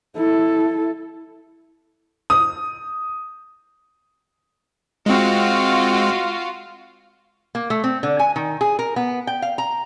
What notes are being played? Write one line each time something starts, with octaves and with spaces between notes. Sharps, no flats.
E4 A4
D#6
G#3 C4 F4 F#4 F5
A#3
A3
C4
D3
G#5
D#3
G#4
A#4
B3
G5
F5
A#5